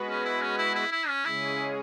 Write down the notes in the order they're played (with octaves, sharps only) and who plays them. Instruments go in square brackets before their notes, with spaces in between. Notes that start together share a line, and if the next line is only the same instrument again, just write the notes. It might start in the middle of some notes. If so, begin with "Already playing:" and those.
Already playing: [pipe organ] G#3 B3 F#4 B4
[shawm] C#4
E4
C#4
E4
E4
E4
C#4
[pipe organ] C#3 G#3 C#4 G#4 [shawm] E4